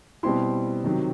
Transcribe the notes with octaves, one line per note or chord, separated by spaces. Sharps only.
B2 G3 C4 E4 C6
C3 D#3 F#3